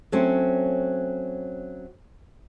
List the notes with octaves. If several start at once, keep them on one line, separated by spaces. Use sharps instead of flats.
F#3 A3 C4 C#4